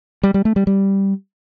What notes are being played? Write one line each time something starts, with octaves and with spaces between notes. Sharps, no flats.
G3
G3
A3
G3
G3